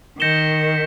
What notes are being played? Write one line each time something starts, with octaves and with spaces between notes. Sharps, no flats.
D#3 G6 A#6 C#7 E7 G7